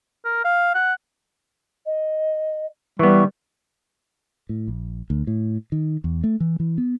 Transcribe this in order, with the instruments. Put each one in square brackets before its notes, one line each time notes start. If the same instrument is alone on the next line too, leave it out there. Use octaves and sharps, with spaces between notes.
[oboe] A#4
F5
F#5
[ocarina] D#5
[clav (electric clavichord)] E3 B3 [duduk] G3 [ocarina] C#6
[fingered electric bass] A2
A#1
D2
A2
D#3
E2
A3
E3
E3
B3